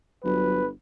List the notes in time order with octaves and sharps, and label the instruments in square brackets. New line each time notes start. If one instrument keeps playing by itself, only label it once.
[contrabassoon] G1 [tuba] F#3 [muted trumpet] B4